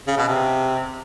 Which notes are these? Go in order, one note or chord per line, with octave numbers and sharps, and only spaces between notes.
C#3
B2
C3